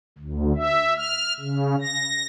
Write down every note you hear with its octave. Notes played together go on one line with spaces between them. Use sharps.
D2
E5
F6
C#3
A#6